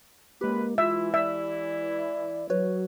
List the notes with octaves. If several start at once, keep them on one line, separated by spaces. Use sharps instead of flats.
C#2 G#3 A#3 G4 B4
E3 E4 F4 E5
D5 E5
F#3 F#4 B4 C#5